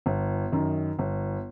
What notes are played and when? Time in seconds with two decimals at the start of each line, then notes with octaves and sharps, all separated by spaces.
0.06 G1
0.52 F#2 D#3
0.99 G1